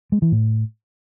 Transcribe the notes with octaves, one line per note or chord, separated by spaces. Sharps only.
G#3
E3
A2